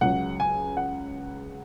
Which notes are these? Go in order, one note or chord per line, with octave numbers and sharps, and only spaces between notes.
C#2 C#3 F#3 F#5
G#5
F#5